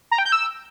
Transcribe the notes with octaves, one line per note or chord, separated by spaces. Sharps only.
A#5
G5
G6
E6